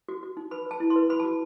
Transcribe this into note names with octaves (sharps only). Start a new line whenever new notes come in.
F#4
F#4
D#4
B4 B5
B4 A5
E4
C6
B4
B4 B5
A5
F#4